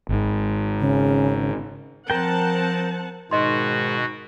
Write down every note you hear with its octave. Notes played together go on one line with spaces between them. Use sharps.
G#1 G#2
C#3
F3 C4 A#4 F#5 G5 A5
G#2 B2 D#3 F#4 D#5 C6